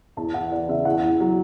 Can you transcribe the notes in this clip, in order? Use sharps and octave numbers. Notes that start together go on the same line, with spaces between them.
E2 A5
E2 F#5
E3 D5
C#3 E5
E2 F#5
E2
F#3